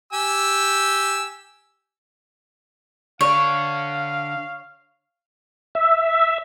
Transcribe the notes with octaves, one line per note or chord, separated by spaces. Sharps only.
G4 G#5 E6
D3 D4 C#5 F5
E5